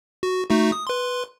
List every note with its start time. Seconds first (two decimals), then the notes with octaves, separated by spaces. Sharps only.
0.23 F#4
0.50 A3 D#4 F#4
0.72 D#6
0.87 B4 C6